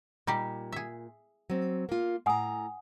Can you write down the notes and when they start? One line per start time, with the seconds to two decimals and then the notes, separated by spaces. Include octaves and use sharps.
0.27 A#2 G3 D#4 G4
0.72 G#4 E5
1.50 F#3 C4
1.89 A#3 F4
2.26 A2 F#5 G#5 A#5 D#6